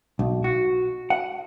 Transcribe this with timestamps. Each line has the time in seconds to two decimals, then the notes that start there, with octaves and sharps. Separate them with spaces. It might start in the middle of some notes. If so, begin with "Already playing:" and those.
0.19 B1
0.44 F#4
1.10 F#5